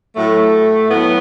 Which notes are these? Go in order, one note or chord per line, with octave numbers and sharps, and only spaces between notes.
A2 F#3 A3
A2 F#3 B3